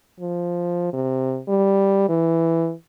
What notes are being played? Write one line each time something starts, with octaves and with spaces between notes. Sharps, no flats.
F3
C3
G3
E3